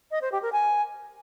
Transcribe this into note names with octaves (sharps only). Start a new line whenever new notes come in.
D#5
C5
G4
A#4
G#5